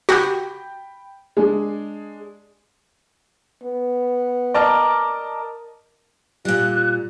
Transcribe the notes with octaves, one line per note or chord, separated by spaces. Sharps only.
F#4 G4 G5 B5 G6
G#3 D4 G#4
B3
A#4 D5 D#5 A5 F6
A#2 G3 F4 F#6